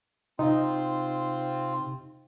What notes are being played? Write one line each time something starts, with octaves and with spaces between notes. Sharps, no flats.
C3 C4 D#4 F4